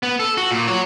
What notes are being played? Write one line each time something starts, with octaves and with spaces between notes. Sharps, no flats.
B3
A4
F#4
A#2
F#4 C#5